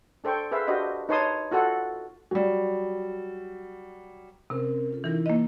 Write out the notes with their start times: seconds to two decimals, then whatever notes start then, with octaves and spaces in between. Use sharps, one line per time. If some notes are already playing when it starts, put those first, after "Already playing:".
0.24 D4 A4 C5 G5 C#6
0.51 G#4 B4 C5 E5 F5
0.67 D4 F#4 G4 C5 D#5
1.09 D#4 B4 C#5 A5 C6 D#6
1.51 F4 F#4 A4 F#5
2.31 F#3 G3
4.50 C3 C4 C#4 A#4
4.91 C#4 F4 A4
5.04 E3 D#4 E4 A#4
5.26 A#3 D#5